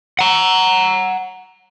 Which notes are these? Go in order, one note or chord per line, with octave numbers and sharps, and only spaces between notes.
F#5 A#5